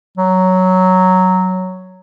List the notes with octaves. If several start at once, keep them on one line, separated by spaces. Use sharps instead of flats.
F#3